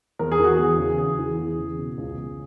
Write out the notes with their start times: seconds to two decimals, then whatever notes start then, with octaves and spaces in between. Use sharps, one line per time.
0.19 E2 A#4
0.32 G#4
0.39 E3 F#4
0.57 E2 G#4
0.78 C#3
0.98 E2 G#4
1.18 E3
1.38 E2
1.58 C#3
1.78 B2
1.98 C#2
2.18 C#2